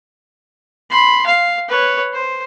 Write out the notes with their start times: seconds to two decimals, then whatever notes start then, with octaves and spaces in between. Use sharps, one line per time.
0.90 B5 C6
1.26 F5
1.68 B4 C#5
2.13 C5